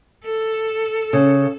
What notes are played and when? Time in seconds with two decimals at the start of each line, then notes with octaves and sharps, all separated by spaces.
0.24 A4
1.13 C#3